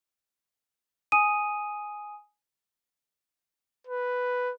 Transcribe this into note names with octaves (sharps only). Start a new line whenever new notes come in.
G#5 D#6 D#7
B4